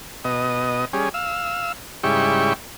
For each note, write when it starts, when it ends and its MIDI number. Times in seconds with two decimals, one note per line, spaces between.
0.25 0.85 47
0.25 0.85 75
0.93 1.09 55
0.93 1.09 61
0.93 1.09 68
1.14 1.72 77
1.14 1.72 88
2.03 2.53 44
2.03 2.53 49
2.03 2.53 55
2.03 2.53 64
2.03 2.53 79
2.03 2.53 85